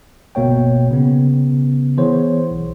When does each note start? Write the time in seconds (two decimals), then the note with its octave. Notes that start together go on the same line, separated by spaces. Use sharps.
0.35 G1 B2 A#3 C#5 G5
0.91 C#3 B3
1.98 E3 B3 G#4 C5 C#5
2.51 B1